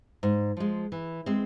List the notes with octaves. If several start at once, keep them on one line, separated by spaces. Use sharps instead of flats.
G#2
F3 G#3
E3
G#3 C4